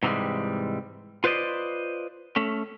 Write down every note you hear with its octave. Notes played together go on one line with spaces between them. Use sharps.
G#2 C3 E3 F3 G3 G#3
F4 B4 C5 D5 D#5
A3 C#4